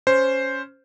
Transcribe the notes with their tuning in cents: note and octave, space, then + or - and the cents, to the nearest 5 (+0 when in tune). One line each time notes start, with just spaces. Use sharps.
C#4 +0 C5 +0